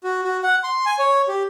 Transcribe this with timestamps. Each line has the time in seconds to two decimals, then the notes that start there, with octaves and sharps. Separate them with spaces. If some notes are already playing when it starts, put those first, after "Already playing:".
0.04 F#4
0.24 F#4
0.43 F#5
0.64 C6
0.86 G#5
0.99 C#5
1.28 G4